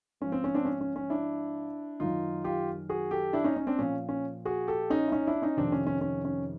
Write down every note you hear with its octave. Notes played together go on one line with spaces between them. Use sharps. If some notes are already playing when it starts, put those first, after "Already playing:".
G#2 F3 C#4
C4
C#4
C4 D4
C#4
C#4
C#4
D4 E4
F#2 D#3 D#4 F4
F4 G4
F#4 G#4
G4 A4
D4 E4
C#4 D#4
C#4
C4 D4
A#2 F3 C#4
C#4
F#4 G#4
G4 A4
C#4 D#4
E4
C#4 D#4
D4 E4
C#4 D#4
F2 C3 D#3 C4 D4
C#4
C#4
C#4
C#4